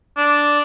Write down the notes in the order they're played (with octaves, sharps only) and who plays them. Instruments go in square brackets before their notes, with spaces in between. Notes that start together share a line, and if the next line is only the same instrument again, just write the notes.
[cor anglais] D4